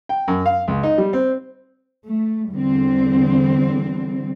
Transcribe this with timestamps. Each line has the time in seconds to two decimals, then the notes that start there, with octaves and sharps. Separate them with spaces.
0.09 G5
0.28 F#2
0.46 F5
0.68 C#2
0.83 D#4
0.98 G3
1.13 C4
2.08 A3
2.50 E2 D3 G3 C4